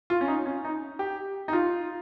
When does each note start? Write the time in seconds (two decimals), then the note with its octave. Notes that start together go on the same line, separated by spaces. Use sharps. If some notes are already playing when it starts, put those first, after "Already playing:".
0.10 F4
0.21 C#4
0.28 D#4
0.46 C#4
0.65 D#4
0.99 G4
1.48 D#4
1.53 F4